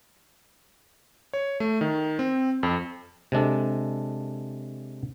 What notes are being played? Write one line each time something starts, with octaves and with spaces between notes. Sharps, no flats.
C#5
A3
D#3
C4
F2
C3 G#3 D4 A4